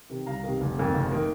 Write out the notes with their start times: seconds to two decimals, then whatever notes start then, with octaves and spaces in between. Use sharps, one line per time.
0.10 C3 D#3
0.26 C2 F5 A#5
0.44 C3 D#3
0.61 F1
0.77 F2 D#3 A#3
0.94 F1
1.11 D#3 A#3